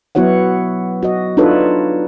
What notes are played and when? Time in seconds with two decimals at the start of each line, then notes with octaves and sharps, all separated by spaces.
0.15 F#3 B3 E4 F#4 C#5 F#5
1.03 F#4 D#5
1.37 D4 D#4 F4 A4 B4 C#5